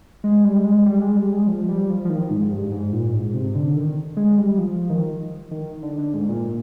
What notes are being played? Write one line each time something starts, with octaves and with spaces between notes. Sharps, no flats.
G#3
G3
G#3
G3
G#3
G3
G#3
F3
G3
F3
F3
D#3
G#2
G2
G#2
A#2
G#2
C3
D3
D#3
G#3
G3
F3
D#3
D#3
D3
D3
G#2
A#2